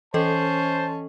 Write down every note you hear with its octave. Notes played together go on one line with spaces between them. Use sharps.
E3 C#4 A4 C5 D#5 A5